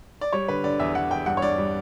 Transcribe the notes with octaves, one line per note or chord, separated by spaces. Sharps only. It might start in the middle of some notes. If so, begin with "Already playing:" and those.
D5
G3 C#5
D3 B4
D3 D5
E2 E5
E2 F#5
E2 G5
G2 F#5
C#5
G2 D5
G3